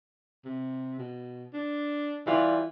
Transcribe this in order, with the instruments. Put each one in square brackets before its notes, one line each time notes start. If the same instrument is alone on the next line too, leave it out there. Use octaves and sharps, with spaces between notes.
[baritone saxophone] C3
B2
D4
[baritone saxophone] E3 [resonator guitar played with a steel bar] G3 F4